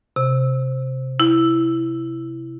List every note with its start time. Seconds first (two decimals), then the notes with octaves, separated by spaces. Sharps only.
0.16 C3
1.20 E4